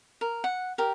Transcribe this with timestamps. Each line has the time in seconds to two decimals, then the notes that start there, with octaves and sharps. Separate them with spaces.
0.21 A#4
0.44 F#5
0.78 G4 A#4